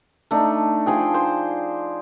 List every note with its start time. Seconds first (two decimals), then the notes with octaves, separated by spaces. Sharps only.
0.31 A3 D4 D#4
0.86 F3 G#4 G5
1.14 C5